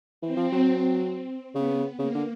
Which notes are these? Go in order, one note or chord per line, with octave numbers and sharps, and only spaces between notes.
E3 C4
F3
F#3
C#3 B3
C#3 A#3
D3